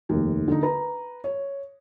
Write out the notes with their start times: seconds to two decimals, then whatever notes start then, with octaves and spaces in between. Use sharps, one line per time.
0.09 F1 D#2
0.48 D3 D#4
0.63 B4 A#5
1.24 C#5